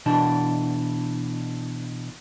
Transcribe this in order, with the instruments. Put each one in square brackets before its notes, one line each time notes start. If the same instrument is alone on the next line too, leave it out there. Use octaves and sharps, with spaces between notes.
[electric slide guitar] B2 E3 D4 A5